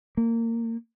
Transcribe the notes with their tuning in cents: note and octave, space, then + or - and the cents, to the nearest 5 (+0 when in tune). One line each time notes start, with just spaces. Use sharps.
A#3 -20